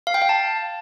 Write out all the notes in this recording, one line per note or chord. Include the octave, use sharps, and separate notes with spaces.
F5
G5
F5
A5